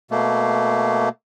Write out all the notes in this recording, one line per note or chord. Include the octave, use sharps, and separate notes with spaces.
B2 A3 A#3